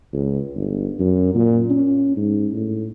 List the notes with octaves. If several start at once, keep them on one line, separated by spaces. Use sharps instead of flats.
C#2
G1
F#2
A#2
C#4
G#2
A2